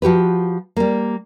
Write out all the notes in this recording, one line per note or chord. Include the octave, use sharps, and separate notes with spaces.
F3 F#4 G4 B4
G3 A#3